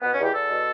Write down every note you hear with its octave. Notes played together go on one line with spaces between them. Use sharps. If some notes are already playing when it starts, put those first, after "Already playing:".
B2 B3
C#4
E2 G4
E2 A4
B2